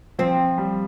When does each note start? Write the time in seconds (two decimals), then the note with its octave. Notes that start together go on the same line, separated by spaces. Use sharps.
0.19 F3 C4
0.58 G3